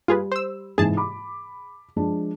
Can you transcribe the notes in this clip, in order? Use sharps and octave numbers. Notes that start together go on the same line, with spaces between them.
G3 F4 G#4 B4
C5 E6
G#2 C3 E3 G#4 A5
B5 D6
F3 G#3 D4